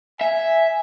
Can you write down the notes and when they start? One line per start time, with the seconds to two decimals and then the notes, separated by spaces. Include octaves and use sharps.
0.21 E5 G#5